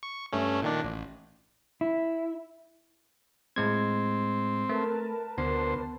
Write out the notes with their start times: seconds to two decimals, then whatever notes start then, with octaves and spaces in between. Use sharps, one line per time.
0.03 C#6
0.32 G2 A3 C#4
0.62 A#2 D#3 D4
0.84 A1
1.81 E4
3.56 A2 G#3 C4 G#6
4.69 A3 A#4 B4 A5
5.38 D2 B3 C5